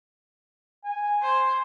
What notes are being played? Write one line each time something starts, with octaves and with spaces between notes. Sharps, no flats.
G#5
C5